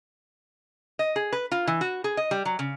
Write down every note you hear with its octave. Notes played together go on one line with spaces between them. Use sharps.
D#5
G#4
B4
F4
E3
F#4
G#4
D#5
G3
F#3
C#3